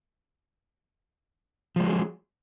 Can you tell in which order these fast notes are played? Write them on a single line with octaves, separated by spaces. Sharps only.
F3 G#3 F#3 G#4